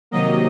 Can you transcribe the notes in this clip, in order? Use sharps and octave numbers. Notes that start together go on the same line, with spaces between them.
C3 D#3 F#3 A#3 D#5